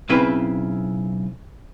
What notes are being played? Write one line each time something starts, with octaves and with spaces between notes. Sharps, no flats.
B1 C#3 C4 E4 B4